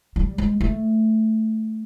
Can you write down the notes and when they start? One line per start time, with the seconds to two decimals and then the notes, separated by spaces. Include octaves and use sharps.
0.16 G3
0.38 G#3
0.61 A3